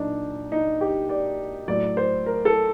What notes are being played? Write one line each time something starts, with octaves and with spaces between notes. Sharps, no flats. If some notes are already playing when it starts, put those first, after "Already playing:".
Already playing: A#2 F#3 D4 D#4
D#4
G4
D5
A2 F#3 D5
C5
A#4
A4